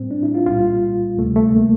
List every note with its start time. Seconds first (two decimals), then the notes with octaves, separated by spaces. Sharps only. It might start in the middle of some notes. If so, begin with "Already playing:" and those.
Already playing: A2 G3 C4
0.11 D4
0.23 E4
0.34 F4
0.46 C2 A#2 G3 F4
1.18 D2 C3 G3 A3
1.36 A3
1.54 A#3